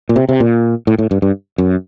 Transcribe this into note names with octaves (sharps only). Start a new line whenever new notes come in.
A#2
C3
C3
A#2
A2
A2
G2
G2
F#2